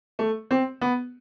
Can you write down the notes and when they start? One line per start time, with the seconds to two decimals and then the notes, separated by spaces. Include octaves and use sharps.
0.19 A3
0.51 C4
0.81 B3